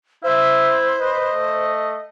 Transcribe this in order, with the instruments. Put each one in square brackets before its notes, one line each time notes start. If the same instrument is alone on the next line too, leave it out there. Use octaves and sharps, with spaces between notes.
[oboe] E4 [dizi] C5 [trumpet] E5
[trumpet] B4 [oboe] D#5
[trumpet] A3